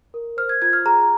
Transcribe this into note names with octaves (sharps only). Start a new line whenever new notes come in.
A#4
C5 F6
G#6
F4 G#6
F6
G#4 A#5